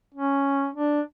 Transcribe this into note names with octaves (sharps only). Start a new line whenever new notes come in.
C#4
D4